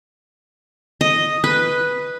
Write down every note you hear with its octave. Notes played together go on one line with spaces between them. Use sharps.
D#5
B4